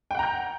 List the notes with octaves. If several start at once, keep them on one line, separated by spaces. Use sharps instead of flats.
F#5 G5 A#5 G6